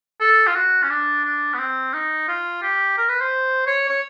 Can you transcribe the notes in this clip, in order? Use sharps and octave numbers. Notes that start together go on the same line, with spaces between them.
A4
F4
F#4
C#4
D4
D4
B3
C4
D#4
F4
G4
A#4
B4
C5
C#5
C#5